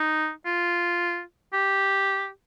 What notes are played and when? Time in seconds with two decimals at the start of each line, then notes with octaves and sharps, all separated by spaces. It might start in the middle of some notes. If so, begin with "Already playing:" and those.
Already playing: D#4
0.46 F4
1.54 G4